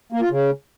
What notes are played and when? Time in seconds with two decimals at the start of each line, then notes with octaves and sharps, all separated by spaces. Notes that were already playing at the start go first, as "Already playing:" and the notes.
0.12 A#3
0.21 F4
0.30 C#3